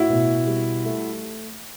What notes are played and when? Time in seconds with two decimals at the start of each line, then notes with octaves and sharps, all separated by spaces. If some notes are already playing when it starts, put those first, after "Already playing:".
Already playing: A2 E4 F#4
0.09 B2
0.47 G3
0.85 A3